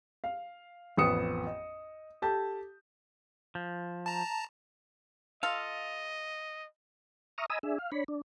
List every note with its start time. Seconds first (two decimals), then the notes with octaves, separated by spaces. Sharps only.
0.24 F5
0.97 A1 F2 B3 D#6 C#7 E7
1.47 D#5
2.22 G4 A4 A5 G6
3.55 F3
4.06 A5 A#5
5.43 F4 A4 D#5 F5
7.38 E5 A#5 C#6 D#6 F6
7.50 D#5 G#5 A#5 B5 D#6 E6
7.63 D4 G#4 E5
7.79 F5
7.92 D4 C#5 B5
8.08 D4